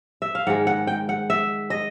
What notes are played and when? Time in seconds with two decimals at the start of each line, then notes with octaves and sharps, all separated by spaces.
0.22 E5
0.35 F5
0.47 G#2 D#3 G#3 F#5
0.67 F#5
0.87 G5
1.09 F#5
1.30 E5
1.70 D#5